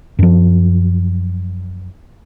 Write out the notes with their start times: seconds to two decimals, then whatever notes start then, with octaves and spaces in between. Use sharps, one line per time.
0.19 F#2 F3